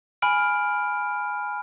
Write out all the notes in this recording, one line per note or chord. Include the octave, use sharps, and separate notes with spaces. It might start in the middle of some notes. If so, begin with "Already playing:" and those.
G#5 B5 F6 D7